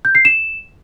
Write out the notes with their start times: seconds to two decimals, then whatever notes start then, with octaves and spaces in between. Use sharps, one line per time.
0.05 G6
0.15 C7
0.25 E7